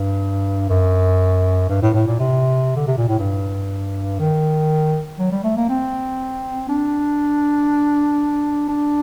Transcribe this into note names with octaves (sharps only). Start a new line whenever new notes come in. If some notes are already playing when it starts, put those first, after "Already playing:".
Already playing: G2
F#2
G2
A2
A2
A#2
C3
D3
C3
A#2
A2
G2
D#3
F#3
G3
A3
A#3
C4
D4
D4